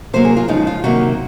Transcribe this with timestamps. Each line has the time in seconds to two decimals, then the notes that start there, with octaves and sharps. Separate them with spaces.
0.13 C3 F#3 A#3 C5
0.25 G#4
0.37 F4
0.48 C#3 F3 G#3 D#4
0.67 F4
0.84 C3 D#3 F#3 A#3 F#4